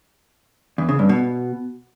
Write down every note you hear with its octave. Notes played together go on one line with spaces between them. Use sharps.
E2
C#3
G2
B2